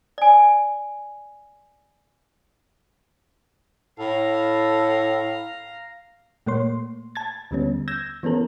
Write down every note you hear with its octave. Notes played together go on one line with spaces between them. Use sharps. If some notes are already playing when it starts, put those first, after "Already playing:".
D5 G#5
A2 A4 F5 A#5
A#2 A3 A#3 C#5 C6
A5 G#6 A6
D#2 D3 G3 B3 C#4
E6 G6 G#6 A#6 E7
E3 B3 C#4 A4 A#4